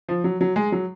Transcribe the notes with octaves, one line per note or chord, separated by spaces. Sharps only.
F3
F#3
F#3
G#3
F#3